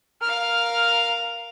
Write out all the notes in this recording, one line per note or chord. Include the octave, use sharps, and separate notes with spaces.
A#4 F5 F6